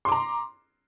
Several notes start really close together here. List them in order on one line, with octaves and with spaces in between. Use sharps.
C6 D6 A#5